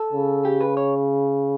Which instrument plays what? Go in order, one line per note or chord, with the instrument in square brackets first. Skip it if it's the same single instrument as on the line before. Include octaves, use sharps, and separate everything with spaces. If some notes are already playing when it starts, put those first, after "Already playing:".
Already playing: [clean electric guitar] A4
[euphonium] C#3
[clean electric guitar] G4
B4
C#5